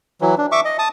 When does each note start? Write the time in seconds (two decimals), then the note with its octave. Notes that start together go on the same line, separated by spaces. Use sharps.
0.21 E3 F#3
0.38 D4
0.52 E5 C#6 D6
0.65 D#5
0.79 A5 D#6